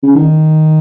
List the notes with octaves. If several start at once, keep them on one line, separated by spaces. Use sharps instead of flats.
C#3
D#3